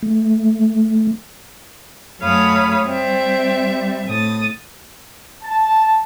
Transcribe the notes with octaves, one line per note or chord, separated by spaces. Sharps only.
A3
F#2 A3 C#5 F5 B5 D#6
G3 C4 E5
A2 D#6 A6
A5